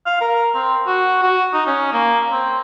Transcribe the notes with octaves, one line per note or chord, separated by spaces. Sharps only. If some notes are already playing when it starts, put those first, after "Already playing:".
F5
A#4
C4
F#4
F#4
D#4
C#4
A#3
C4